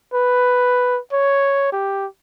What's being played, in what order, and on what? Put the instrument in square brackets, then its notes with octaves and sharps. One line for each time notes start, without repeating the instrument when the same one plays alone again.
[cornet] B4
C#5
G4